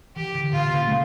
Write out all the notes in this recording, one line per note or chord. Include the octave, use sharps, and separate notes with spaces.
E3 G4
D3
A#2 F4
C#3
A3